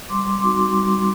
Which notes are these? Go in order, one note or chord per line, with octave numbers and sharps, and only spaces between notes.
G3 C6 D6
C4 D#4 F#4 C6 D6
G3